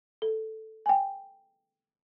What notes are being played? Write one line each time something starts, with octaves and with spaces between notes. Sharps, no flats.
A4
G5 G#5